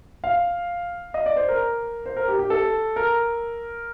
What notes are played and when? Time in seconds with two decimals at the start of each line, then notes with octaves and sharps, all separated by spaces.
0.24 F5
1.14 D#5
1.26 D5
1.36 C5
1.48 A#4
2.06 C5
2.16 A#4
2.28 G4
2.39 G4
2.50 A4
2.96 A#4